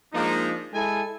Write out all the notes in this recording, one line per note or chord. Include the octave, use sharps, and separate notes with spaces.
F3 G#3 A#3 D4 D#4
G#3 E4 A4 G#5